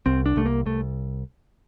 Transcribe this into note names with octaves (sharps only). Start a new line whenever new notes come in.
C2 C4
D4
C2 A3
A#3
C2 A3